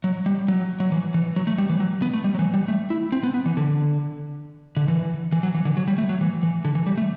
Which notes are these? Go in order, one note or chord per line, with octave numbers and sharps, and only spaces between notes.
F#3
G3
F#3
F#3
E3
E3
F#3
A3
G3
E3
F#3
B3
A3
G3
F#3
E3
G3
A3
E4
C4
B3
B3
E3
D3
D3
E3
E3
F#3
E3
D3
F#3
G3
A3
F#3
E3
E3
D3
E3
G3
A3